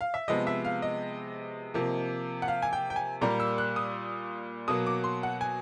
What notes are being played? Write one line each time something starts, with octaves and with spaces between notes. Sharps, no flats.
F5
E5
C3 F3 G#3 B3 D#5
E5
F5
D#5
C3 F3 A#3
F#5
F5
G#5
G5
G5
G#5
A#2 G3 A#3 A#5
E6
F#6
D#6
B2 F#3 A#3 D#6
D6
C6
F#5
G#5